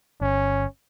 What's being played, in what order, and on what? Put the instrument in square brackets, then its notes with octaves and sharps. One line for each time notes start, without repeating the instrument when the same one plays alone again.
[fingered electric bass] G1 [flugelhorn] C#4